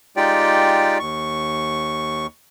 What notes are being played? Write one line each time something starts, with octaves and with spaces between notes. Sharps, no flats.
G#3 D#4 F4 G4 D5 G5
D#2 C#6